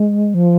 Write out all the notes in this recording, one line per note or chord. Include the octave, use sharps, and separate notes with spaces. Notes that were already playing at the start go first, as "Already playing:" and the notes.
Already playing: G#3
F3